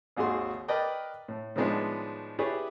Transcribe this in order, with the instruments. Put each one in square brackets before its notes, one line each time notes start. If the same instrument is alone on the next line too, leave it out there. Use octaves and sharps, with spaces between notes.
[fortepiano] G#1 D#2 F#4 G#4 C6
A#4 B4 D5 D#5 G5
A2
A2 D#3 F3 G#3 B3 D4
E4 G4 G#4 B4 C#5 D5